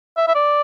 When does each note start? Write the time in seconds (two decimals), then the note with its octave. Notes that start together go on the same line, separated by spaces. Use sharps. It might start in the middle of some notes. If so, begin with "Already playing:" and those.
0.17 E5
0.28 E5
0.35 D5